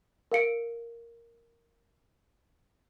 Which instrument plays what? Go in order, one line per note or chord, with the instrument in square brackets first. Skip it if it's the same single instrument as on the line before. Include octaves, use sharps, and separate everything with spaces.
[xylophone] A#4 F5 C#7 D7